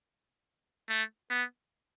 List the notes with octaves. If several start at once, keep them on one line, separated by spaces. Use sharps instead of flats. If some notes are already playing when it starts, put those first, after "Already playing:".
A3
B3